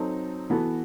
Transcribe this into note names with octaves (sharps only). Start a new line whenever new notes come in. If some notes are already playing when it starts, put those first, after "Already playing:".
Already playing: F#3 C4 D#4 A4
E3 B3 F#4 A4